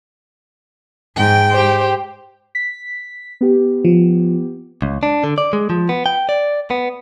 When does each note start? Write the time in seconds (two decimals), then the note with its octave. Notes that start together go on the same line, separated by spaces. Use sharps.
1.16 G#2 G5
1.51 G4 C5
2.55 B6
3.41 B3 G4
3.85 F3
4.82 C#2
5.03 D4
5.24 D3
5.38 D5
5.53 G#3
5.70 F3
5.89 B3
6.06 G5
6.29 D5
6.70 B3